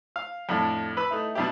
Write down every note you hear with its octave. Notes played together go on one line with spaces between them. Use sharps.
F5
F2 A2 D4
B4 B5 E6
A3 D#4 E4
B2 G3 D4 E4 G4